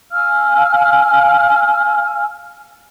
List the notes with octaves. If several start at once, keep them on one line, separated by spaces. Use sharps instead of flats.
F5 G#5 E6 F6